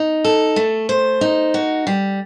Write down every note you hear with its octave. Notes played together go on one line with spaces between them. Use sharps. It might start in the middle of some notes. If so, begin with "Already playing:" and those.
Already playing: D#4
A4
A3
C5
D#4
F#4
G3